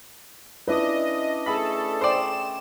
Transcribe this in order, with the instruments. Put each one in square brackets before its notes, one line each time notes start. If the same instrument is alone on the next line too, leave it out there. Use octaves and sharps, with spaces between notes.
[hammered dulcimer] C#4 D4 D5 [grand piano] E4 B4 [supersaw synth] D#5
[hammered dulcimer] A3 G#4 [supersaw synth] A4 [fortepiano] B5
[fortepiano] C5 D5 [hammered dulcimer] D#5 G5 [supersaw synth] E7